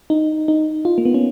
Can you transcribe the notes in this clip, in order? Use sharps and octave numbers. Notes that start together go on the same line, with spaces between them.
D#4
D#4
F4
A#3
B3
C#4